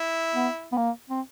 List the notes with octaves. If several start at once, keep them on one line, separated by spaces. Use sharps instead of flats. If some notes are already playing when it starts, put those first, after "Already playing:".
Already playing: E4
B3
B3
A#3
C4